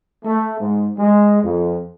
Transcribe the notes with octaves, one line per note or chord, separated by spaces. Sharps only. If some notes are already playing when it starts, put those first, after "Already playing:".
A3
G#2
G#3
F2